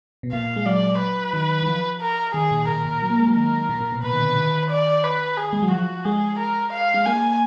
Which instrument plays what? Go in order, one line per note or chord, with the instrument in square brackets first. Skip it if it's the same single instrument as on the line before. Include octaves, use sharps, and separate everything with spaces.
[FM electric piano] B2
[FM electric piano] A#2 [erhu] F5
[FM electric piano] G#3
[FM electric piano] F#3 [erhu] D5
[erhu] B4
[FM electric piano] D#3
D#3
F3
[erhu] A#4
[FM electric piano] D#3 [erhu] G#4
[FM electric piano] A#2
[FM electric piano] A#2 [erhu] A#4
[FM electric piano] A#2
F#3
A#3
G#3
F#3
[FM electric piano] D#3 [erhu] A#4
[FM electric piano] A#2
A#2
B2
[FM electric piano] B2 [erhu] B4
[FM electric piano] D#3
D3
D#3
[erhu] D5
B4
G#4
[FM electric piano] G#3
F#3
[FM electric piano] F3 [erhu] F#4
[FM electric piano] G#3 [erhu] G#4
[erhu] A#4
F5
[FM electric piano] G#3
[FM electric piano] A#3 [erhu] G#5